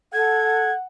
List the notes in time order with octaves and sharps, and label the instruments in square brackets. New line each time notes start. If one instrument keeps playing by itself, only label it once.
[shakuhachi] A4 [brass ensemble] F#5 [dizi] G#6